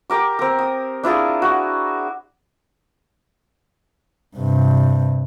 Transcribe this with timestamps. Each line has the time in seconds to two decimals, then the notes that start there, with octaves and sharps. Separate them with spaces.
0.10 G4 A#4 D6
0.39 C4 A#4
0.59 D#6
1.03 D4 E4 F4 G#4
1.42 F#4
4.36 G2 C3